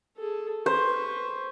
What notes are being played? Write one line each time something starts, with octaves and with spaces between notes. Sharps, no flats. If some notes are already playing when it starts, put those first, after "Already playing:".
G#4 A4
B4 C5 C#6